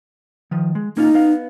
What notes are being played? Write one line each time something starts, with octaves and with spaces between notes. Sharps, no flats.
D#3 F3
G#3
A#3 C#4 D#4 F4
B3 F5